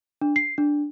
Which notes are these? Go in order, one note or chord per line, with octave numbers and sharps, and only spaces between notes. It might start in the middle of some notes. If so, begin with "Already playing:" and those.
D4
C7
D4